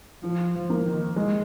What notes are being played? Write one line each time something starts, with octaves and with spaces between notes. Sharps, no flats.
F3 F4
F3
A#3
D#3
G#3